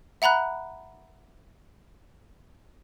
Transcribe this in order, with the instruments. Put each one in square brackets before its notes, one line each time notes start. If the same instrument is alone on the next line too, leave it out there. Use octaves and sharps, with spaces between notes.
[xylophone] E5 F#5 A#5 B5 F#6